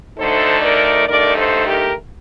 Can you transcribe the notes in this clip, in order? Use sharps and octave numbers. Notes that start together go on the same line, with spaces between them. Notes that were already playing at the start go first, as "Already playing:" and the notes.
D2 D3 A3 D#4 A4 C5
A#4 D5
G2 D3 A3 D#4 A#4 D5
A4 C5
G4 A#4